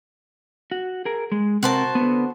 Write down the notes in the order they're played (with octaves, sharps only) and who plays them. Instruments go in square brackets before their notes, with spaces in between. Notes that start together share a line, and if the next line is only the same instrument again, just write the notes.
[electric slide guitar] F#4
G#4 A#4
G#3
[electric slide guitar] C3 A#4 [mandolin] F#4 C5 A5
[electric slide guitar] D3 B3